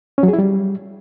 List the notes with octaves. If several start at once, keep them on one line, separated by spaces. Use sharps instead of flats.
C#4
F#3
G#4
E4
G3